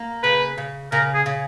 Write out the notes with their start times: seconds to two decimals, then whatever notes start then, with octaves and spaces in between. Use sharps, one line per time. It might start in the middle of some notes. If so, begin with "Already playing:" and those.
Already playing: A#3
0.23 C#3 B4
0.58 C#3
0.92 C#3 A#4
1.14 G#4
1.26 C#3